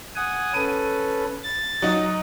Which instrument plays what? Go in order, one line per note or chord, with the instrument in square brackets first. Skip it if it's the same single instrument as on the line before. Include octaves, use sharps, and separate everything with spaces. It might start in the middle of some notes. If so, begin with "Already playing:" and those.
[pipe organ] F#5 G#5 D#6
[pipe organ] C#4 A4 B4 [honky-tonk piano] D#7
[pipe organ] A6
[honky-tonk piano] F#3 D#4